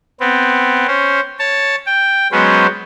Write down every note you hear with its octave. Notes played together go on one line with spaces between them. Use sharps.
B3 C4
C#4 C5
C#5 A5
G5
F#3 G#3 B3 C#4 C5